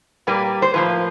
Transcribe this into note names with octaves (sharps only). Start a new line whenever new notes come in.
A#2 G3 A#3 B4
C5
A2 F3 A#3 B4